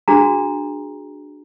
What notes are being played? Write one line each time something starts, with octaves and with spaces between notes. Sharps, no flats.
D4 F#4 G#4 A#5